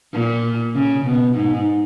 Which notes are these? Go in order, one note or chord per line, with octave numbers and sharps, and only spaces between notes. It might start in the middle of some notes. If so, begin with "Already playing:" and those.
A#2
C#3
B2
G#2